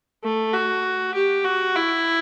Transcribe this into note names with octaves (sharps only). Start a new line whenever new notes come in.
A3
F#4
G4
F#4
E4